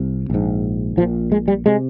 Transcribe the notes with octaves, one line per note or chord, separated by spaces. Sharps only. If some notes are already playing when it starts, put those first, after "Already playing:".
Already playing: C2 C3
A#1 G#2
A#1 A#2 F3
G#3
G3
C3 G#3